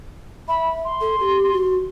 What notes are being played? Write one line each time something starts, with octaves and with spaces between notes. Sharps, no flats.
E5 B5
C6
A4
G4
F#4